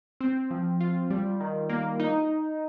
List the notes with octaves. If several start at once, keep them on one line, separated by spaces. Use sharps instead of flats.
C4
F3
F4
G3
D#3
A#3
D#4